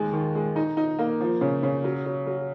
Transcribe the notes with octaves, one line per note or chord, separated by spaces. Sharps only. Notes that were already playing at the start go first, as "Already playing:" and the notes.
Already playing: D#2 G#3
D#3
G#3
D#4
D#4
A#3
F3
C#3
C#3
F#3
F#3
F#3